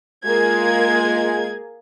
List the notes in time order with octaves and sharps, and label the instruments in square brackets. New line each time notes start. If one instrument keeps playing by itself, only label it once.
[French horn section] G#3 F4 [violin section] A#3 G#4 G#6